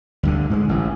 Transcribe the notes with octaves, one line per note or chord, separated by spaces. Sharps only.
D2 G2 D3
G#2 G3 G#3
A1 E3